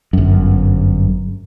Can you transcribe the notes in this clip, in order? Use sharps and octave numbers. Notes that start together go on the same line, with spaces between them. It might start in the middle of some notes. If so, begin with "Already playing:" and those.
G1 F#2